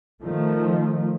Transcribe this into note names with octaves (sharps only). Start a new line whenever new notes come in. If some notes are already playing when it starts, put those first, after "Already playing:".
D#3 F3 A3